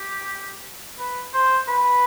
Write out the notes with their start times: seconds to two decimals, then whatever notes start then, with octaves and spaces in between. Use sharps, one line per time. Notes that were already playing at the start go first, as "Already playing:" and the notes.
Already playing: G4
0.99 B4
1.34 C5
1.68 B4